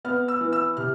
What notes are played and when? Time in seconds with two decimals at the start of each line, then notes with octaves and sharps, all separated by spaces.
0.05 B3 F6
0.28 E6
0.41 E3
0.53 E6
0.77 C3 F6